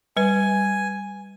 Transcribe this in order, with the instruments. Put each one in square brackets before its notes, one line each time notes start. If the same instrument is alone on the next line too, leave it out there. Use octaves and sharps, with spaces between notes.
[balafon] G3 B4 [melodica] G#5